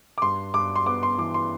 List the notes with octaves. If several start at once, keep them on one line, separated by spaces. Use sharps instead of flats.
D6
G2 C6
G2 D6
C6
B3 D6
C6
E3 D6
C6